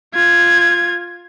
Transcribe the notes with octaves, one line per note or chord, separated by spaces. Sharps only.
F4 G#6